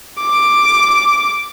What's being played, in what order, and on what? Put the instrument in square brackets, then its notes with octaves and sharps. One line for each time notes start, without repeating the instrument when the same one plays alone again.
[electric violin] D6